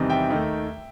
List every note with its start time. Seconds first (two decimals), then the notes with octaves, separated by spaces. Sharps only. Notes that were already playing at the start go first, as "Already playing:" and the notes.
Already playing: E2 C3 D#3 G3 C4
0.10 E5 G5
0.29 D#2 D#3 A3